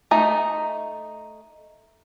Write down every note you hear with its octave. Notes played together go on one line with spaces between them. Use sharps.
A3 D#4 A#5